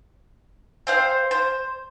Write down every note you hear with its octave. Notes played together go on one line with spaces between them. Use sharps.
C4 C5 F5
C5